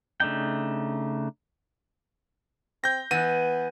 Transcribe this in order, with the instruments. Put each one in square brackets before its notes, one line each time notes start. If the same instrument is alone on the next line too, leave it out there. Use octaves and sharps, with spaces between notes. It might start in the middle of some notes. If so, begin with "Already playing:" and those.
[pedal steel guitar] C#3 A3 D4 D#4 G5
[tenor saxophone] C4 [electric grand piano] G6 A#6
[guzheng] E3 [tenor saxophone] B3 [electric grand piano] D#7